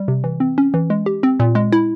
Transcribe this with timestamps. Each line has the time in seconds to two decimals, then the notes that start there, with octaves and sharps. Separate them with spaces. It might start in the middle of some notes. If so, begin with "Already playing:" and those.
Already playing: G3
0.08 C3
0.24 E3
0.40 C4
0.58 C#4
0.74 E3
0.90 G#3
1.06 G4
1.23 C4
1.40 A#2
1.55 G#3
1.73 E4